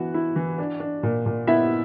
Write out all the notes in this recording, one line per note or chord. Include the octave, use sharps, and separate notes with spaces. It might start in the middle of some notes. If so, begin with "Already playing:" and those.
Already playing: E3 B3 E4 F#4
E4
E3
D4
D4
A#2
A#2
B3 E4 E5